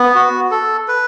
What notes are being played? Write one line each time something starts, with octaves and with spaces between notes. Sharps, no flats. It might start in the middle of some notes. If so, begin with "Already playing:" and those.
Already playing: B3
F#4
A4
B4